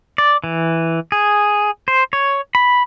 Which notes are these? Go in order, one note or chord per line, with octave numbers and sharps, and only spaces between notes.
D5
E3
G#4
C5
C#5
B5